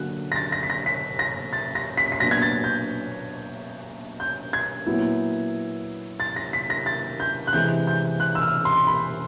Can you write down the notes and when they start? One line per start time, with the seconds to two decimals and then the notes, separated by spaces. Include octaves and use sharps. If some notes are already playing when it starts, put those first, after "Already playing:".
Already playing: D3 F#3 A#3 F#6
0.32 A#6
0.36 A6
0.52 A#6
0.63 B6
0.70 A#6
0.86 B6
1.19 A#6
1.53 A6
1.75 A#6
1.97 B6
2.12 B6
2.20 A#2 F#3 B3 D4 A#6
2.31 G#6
2.42 A6
2.64 G6
4.20 G6
4.53 G#6
4.86 A#2 F#3 B3 E4
6.20 A6
6.36 A#6
6.53 B6
6.70 A#6
6.86 A6
7.20 G6
7.47 F#6
7.53 C3 E3 G#3 G6
7.87 G6
8.20 F#6
8.35 E6
8.42 F6
8.65 C6
8.87 B5